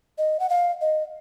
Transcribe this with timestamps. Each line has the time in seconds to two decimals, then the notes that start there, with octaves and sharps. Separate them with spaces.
0.18 D#5
0.40 F#5
0.50 F5
0.81 D#5